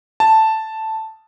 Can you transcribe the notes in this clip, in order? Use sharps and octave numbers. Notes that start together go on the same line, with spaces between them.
A5